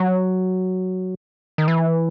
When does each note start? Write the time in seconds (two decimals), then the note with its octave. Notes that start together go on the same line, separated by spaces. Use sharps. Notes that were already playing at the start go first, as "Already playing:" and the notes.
Already playing: F#3
1.58 D#3
1.68 E3